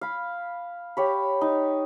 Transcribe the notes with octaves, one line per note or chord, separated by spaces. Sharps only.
F5 B5
G4 C#5 B5
D#4